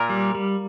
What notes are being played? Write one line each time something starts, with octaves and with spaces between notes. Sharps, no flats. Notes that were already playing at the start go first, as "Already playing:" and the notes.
Already playing: A#2 A#4
G3
G3